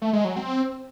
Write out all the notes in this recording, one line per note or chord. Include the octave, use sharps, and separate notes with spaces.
A3
G#3
F#3
C4